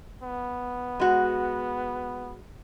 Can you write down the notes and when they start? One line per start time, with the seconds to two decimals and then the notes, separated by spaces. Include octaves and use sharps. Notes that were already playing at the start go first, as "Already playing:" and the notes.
0.23 B3
1.00 G#3 F#4